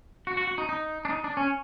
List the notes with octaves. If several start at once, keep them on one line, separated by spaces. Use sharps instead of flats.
F#4
F#4
F#4
D#4
D#4
D4
D#4
D4
C#4